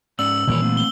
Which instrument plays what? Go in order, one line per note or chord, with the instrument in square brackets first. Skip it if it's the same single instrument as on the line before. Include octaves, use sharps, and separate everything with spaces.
[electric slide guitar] G#2 C#4 D5 [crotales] E6 F#7
[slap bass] A#2 E3 G3 [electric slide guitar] D#3 A#4 C#5
[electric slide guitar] A3 C4
[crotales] G7